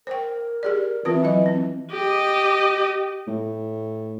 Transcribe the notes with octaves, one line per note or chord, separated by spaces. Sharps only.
A#4 C5 G5
G4 G#4 D5
E3 C4 F4 B4
F#3 E4 D#5
C4
G4 D#5
A2